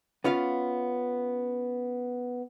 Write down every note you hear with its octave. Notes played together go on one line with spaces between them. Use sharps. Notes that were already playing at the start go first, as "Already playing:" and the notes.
B3 C#4 F4 F5